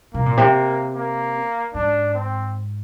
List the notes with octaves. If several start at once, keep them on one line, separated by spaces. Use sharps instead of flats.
C3 A#3
A#2
C3
A#3
G#2 D4
C4